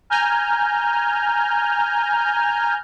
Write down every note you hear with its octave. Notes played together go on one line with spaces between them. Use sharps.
G#5 A#5 F6 G6